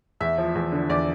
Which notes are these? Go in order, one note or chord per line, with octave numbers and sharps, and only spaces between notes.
E2 E5
F3
E2
D3
E2 D5